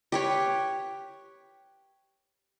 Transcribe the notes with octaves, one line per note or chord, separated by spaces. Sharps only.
G4 B4 C#5